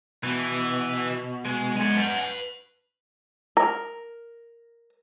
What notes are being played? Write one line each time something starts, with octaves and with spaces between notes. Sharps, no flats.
B2 E3
G#3
G#3 B3 F#5 G#5
B4 A5
A#4